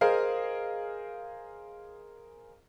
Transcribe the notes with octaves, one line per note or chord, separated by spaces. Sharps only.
G#4 A#4 C5 D#5 F5